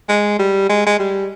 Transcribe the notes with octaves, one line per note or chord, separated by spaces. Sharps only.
G#3
G3
G#3
G#3
G3